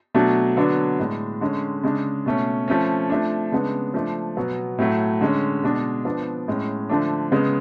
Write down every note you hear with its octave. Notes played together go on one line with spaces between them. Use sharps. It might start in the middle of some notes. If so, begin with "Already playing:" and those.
B2 F#3 A3 D4
D3 F#3 B3 D4
A2 G#3 D4
D3 G#3 C#4
C#3 G#3 D4
B2 A3 C#4
F3 A3 C#4
F3 A3 D4
C#3 G#3 B3 D4
F3 A3 D4
B2 F#3 B3
A2 F#3 A3
D3 G#3 C#4
B2 G#3 D4
F3 B3 D4
A2 G#3 C#4
D3 F3 A3 D4
C#3 G#3 B3